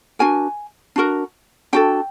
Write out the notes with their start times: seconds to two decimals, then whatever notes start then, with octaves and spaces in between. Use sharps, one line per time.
0.19 D4 F#4 A#4 G#5
0.96 D4 F#4 A#4
1.73 D4 F#4 A4 G5